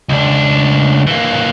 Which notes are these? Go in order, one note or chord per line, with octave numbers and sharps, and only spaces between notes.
C#2 D4
E3 A#3